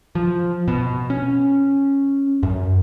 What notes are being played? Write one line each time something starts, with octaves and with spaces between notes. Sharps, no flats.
F3
B2
C#4
F#2